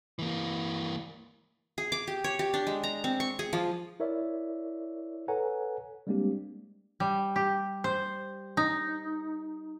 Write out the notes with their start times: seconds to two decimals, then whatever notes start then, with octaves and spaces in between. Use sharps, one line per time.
0.19 E3 A#3
1.78 G#4
1.92 D6
2.07 G4
2.24 C#5
2.39 G4
2.54 D4
2.67 G#3
2.84 A#5
3.04 C4
3.20 C#6
3.39 G#4
3.53 F3
4.00 E4 A#4 C#5 D5 E5
5.28 A4 B4 C#5 F#5 G#5 A#5
6.07 G3 G#3 A#3 C4 D4 G4
7.00 G3
7.36 G4
7.84 C5
8.57 D#4